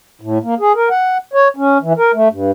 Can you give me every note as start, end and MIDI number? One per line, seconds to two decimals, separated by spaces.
0.21 0.38 45
0.43 0.55 58
0.60 0.72 68
0.75 0.89 70
0.90 1.18 78
1.33 1.48 73
1.56 1.78 61
1.82 1.93 52
1.98 2.12 70
2.14 2.28 57
2.31 2.51 43